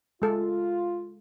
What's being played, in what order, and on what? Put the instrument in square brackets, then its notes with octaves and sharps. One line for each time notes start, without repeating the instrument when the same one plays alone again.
[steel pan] G#3 A4 [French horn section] F4